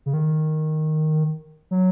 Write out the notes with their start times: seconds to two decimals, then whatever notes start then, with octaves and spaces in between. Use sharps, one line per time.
0.06 C#3
0.14 D#3
1.71 F#3